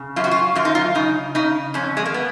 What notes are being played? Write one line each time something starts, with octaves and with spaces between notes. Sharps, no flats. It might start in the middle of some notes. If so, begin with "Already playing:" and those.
Already playing: C#3
F#2 F4
F#4
F4
F#2 F4
D#4
F4
C#3 D#4
C#3 D#4
F2 C#4
G#3
A#3
B3